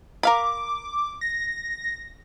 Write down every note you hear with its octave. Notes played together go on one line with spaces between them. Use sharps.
A#4 F5 B5 D6
A#6